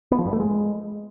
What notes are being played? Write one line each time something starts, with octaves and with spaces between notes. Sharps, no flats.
B3
F3
G2
A3
G#3